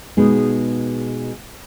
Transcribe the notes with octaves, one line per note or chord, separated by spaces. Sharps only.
B2 G#3 B3 D#4